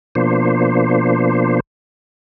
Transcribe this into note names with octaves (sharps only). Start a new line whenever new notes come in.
B2 F3 A#3 D4 C5